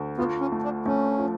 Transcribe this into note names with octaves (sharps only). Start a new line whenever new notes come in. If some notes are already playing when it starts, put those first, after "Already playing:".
Already playing: D2
B3 F4
C#4
A3
D4
A3 C#4
F3